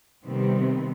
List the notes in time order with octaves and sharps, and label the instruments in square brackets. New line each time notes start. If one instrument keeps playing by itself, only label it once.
[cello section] C3 D#3 G3 B3 C4